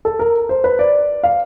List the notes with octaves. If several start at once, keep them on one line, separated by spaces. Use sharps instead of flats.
A4
A#4
C5
B4
D5
F5